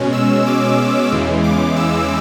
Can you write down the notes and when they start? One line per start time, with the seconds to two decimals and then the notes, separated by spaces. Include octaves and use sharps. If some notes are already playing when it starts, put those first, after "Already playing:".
Already playing: B2 G#3 C#4
0.13 E6
0.46 D6
1.11 E2 C#3 E3 G#3
1.44 D6
1.76 E6